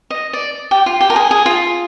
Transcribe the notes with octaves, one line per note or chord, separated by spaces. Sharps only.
D#5
D5
G4
F4
G4
A#4
G#4
G#4
F4